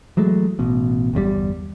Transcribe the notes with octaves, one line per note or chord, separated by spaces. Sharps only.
E3 F#3 G#3 A3
A1 B2
G1 E2 C3 G3